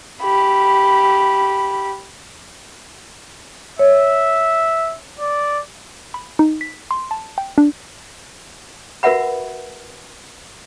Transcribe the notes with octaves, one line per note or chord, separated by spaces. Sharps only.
G4 B5
C#5 E5
D5
B5
D#4
B6
C6
A5
G5
D4
F#4 A#4 B4 E5 F#5 B5